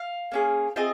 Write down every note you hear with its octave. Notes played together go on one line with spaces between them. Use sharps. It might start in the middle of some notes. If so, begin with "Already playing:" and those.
Already playing: F5
A#3 C#4 G#4
C4 F4 G#4 D#5